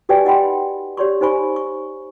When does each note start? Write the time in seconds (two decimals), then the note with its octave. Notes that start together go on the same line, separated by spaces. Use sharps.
0.09 F#4 G4 B4 D5 G5 G#5
0.25 D#4 D#5 F#5 G5 B5 C6
0.97 G4 C#5 D5 C6 C#6
1.21 D#4 G4 C5 G#5 B5 C#6
1.56 C#6